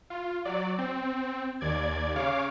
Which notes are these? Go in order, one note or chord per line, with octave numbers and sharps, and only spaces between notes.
F4
F#3 D5
C4
D#2 D5 G#6
C#3 C#5 F5 D6